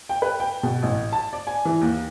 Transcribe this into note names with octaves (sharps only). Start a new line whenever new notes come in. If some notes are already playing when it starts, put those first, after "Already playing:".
G5
B4
G5
B2
A1
A5
D5
G#5
E3
D#2